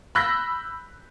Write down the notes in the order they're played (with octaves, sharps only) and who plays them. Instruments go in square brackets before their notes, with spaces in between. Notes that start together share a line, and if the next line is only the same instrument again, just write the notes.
[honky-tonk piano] B5 E6 F#6 G6 A#6 B6